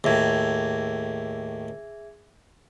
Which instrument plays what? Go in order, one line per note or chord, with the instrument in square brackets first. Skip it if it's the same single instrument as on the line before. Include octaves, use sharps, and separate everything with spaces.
[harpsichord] D#2 A2 [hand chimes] G#4 E5 G#6